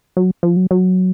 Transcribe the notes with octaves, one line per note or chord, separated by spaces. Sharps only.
F#3
F3
F#3
F#3